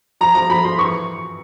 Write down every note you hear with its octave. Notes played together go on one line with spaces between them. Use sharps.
F3 A#5
F3 A#5
F3 B5
F3 C6
E3 C#6